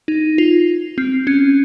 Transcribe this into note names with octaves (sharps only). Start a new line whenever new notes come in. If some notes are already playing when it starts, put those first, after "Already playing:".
D#4
F4
C4
C#4